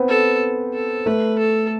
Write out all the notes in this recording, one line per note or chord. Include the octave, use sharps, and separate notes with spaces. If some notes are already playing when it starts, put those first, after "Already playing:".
Already playing: B3 C4
A4
A4
A3 B4
A4